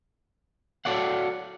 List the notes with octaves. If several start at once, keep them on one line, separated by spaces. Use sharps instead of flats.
F#4 A4 C#5 D5 F5 F#5